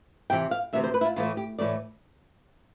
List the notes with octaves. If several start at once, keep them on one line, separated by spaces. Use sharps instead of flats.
D2 C3 E3 G5
F5
D2 C3 E3 E5
C5
B4
E4
F4
A2 E3 A3 F4
G4
A2 E3 A3 D5